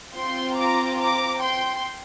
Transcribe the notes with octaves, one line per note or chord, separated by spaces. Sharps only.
C4 F4 G5 C6
A#5 D6
A#5 D6
G5 C6